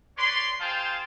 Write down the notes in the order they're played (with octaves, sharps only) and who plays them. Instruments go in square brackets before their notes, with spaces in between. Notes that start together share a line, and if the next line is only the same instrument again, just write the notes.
[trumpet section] B4 C#5 D5 C6
F4 G#4 C5 F5 G5 A5